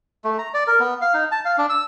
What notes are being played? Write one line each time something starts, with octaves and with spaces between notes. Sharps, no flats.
A3
A#5
D5
A#4
B3
F5
D#4
A5
F5
D4
E6